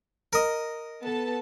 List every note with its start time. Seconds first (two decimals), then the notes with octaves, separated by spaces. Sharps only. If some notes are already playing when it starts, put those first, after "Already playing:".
0.33 A#4 D#5
1.03 B3 A4 A5